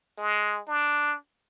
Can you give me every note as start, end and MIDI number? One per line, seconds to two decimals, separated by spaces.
0.18 0.60 56
0.68 1.15 62